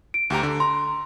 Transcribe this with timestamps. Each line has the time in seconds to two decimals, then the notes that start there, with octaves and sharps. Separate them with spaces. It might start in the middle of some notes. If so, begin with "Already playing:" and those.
0.14 D7
0.30 D2 G4 A#5
0.43 D3
0.60 A#5 C6